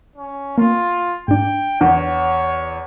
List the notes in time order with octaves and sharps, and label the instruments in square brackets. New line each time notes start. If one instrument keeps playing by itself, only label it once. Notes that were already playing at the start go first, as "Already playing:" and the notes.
[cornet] C#4
[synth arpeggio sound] A#3 [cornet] F4
[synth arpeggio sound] G#2 D4 [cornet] G5
[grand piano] E2 [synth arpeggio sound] D4 [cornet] C#5